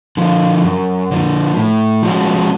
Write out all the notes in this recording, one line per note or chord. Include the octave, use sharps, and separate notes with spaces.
D3 F3
F#2
D3 F3
A2
F3 G#3 C#4 F#4